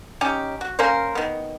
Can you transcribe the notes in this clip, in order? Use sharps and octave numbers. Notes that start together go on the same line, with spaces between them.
C#4 D#4 G4
F#4
A#3 C#4 A#4 C5
D#3 B3